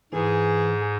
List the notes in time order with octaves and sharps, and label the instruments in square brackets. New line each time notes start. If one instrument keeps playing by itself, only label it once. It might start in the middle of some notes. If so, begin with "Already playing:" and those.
[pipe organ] G#2 [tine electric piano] E3 [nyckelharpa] G#4